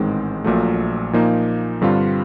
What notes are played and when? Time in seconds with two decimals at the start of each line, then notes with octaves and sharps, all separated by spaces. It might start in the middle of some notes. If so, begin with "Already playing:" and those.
Already playing: A1 G#2 D#3 G#3 C4
0.44 A#1 A#2 F#3 A3
1.13 A#2 F3 A#3 D#4
1.81 G2 D3 G3 C4 F4